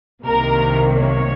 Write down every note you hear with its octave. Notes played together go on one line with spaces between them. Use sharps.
C2 C3 D#3 A#3 A#4
C#5